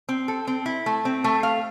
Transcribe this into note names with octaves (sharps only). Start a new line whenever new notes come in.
C4
A4
C4
E4
A3
C4
A3
F5